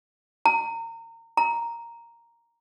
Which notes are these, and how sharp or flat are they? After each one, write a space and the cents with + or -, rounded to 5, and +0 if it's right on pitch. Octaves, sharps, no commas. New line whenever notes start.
A#5 -30
A#5 +0